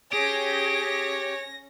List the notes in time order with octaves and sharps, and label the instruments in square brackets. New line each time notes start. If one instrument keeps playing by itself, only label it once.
[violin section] C#4 A#6 [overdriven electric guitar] G4 [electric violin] G#4 [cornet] C#5